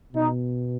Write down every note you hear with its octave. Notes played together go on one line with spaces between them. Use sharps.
B2 D#4